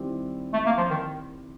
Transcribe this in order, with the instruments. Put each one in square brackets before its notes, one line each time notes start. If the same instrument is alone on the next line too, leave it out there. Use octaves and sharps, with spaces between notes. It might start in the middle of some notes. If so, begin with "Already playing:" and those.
Already playing: [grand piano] D#3 G3 C4 E4 G4
[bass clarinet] A3
A#3
F3
D#3